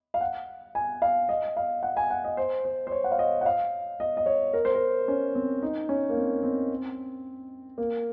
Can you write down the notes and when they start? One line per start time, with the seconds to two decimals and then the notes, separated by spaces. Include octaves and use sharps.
0.14 F5
0.21 F#5
0.75 G#5
1.02 F5
1.29 D#5
1.57 F5
1.83 F#5
1.97 G#5
2.11 F#5
2.24 D#5
2.37 C5
2.65 C5
2.87 C5
2.92 C#5
3.04 F#5
3.11 F5
3.19 D#5
3.41 F#5
3.46 F5
4.00 D#5
4.17 D#5
4.26 C#5
4.53 A#4
4.65 C5
4.75 A#4
5.08 C#4
5.35 C4
5.62 D#4
5.89 C#4
6.10 A#3
6.17 C4
6.43 C4
7.78 A#3